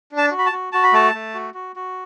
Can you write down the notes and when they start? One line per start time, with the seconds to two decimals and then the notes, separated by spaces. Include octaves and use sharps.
0.12 D4
0.17 A5
0.31 F#4
0.39 B5
0.46 A5
0.52 F#4
0.72 F#4 A5
0.83 B5
0.93 A3 A5
1.14 A3
1.34 F#4
1.54 F#4
1.76 F#4